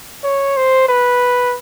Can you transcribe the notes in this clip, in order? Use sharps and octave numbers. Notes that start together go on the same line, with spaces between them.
C#5
C5
B4